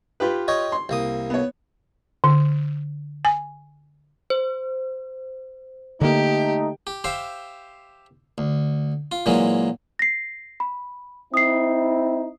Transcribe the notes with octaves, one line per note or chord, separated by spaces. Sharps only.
F4 G4 B4
C#5 D#5 G5
C6
C2 A#3 D#6
B3 C#5
D3
G#5
C5
D3 A3 A#3 D#4 G4
G4
G4 C5 E5 F5
D2
F4
A#2 E3 F#3 G#3 A#3
A#6 C7
B5
C4 D#4 E4 D#6 C7